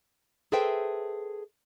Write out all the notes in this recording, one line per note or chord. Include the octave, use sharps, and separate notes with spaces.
G#4 A4 B4 C5 E5 G5